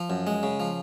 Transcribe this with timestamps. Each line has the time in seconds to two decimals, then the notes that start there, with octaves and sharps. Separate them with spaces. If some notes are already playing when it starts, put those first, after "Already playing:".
Already playing: F3
0.10 F#2
0.27 G#3
0.43 C#3
0.60 F3